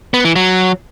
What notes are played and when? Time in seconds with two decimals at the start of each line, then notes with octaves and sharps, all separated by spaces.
0.14 B3
0.25 E3
0.36 F#3